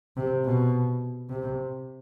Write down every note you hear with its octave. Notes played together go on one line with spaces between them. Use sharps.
C3
B2
C3